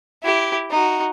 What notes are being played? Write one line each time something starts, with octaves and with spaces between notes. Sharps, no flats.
E4 G4
D#4 F#4